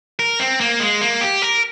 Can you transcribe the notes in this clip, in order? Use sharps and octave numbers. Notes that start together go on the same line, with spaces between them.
A#4
C4
A#3
G#3
A#3
G4
A#4